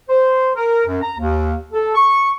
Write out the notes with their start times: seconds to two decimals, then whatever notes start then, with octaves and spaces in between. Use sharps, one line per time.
0.09 C5
0.55 A#4
0.87 F#2
1.02 A#5
1.18 D#2
1.73 A4
1.95 C#6